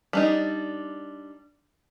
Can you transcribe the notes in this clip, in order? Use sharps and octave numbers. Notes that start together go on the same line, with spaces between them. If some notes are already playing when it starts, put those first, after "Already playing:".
G3 D4 D#4